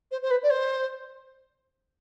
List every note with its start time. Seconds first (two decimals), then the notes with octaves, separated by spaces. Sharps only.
0.12 C5
0.22 C5
0.31 B4
0.43 D5
0.50 C5